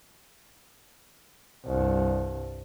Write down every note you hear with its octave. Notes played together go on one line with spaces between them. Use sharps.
C2 G2